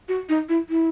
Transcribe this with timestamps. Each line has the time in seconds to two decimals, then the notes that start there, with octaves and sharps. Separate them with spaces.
0.09 F#4
0.29 D#4
0.49 E4
0.69 E4